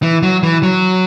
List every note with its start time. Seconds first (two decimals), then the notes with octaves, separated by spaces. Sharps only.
0.03 E3
0.23 F#3
0.43 E3
0.63 F#3